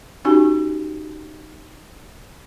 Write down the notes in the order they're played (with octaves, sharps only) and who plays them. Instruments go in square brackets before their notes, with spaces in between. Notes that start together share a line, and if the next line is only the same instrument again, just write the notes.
[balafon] C#4 D#4 F#4 G4 G#5